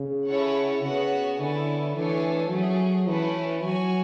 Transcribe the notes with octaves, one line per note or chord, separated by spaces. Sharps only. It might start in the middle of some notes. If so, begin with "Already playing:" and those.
Already playing: C#3
C#4 E4 A4 C#5 F#5
C#3 B3 F#4 C#5 F#5
D3 B3 E4 A4 C#5 G#5
E3 A3 D4 A4 C#5 G#5
F#3 A3 C#4 G#4
E3 A3 C#4 E4 B4
F#3 F#4 C#5 G#5